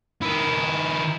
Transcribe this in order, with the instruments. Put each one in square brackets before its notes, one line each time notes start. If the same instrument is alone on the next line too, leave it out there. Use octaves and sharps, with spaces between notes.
[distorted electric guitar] D#3 E4